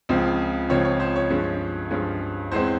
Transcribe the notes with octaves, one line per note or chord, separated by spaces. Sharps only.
C#2 C#3 F3 C4
C#2 C#3 F3 C4 C#5
C#5
C5
C#5
G2 F3 G#3 C#4
G2 F3 G#3 C#4
E2 E3 G#3 C4 C5